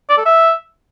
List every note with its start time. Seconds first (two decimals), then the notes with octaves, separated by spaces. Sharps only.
0.10 D5
0.17 A4
0.25 E5